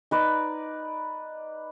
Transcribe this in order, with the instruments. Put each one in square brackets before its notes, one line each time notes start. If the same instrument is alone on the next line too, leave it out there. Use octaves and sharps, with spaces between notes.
[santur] D#4 B4 D5